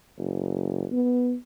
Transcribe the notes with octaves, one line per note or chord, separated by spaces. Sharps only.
F#1
B3